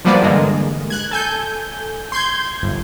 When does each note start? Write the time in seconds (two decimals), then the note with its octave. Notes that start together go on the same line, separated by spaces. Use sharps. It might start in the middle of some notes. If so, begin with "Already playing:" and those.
0.05 F3 G3 A#3 B3 D4 D5
0.22 G2 D3 E3 G#3 A#3
0.90 F#6 G#6
1.11 A4 G#5 G6
2.12 C6 G6 G#6
2.63 G1